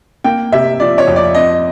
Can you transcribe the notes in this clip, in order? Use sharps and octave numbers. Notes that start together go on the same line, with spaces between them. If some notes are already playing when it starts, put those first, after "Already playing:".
A#3 G5
C3 E5
F3 D5
C#5
F2
D5
C4 D#5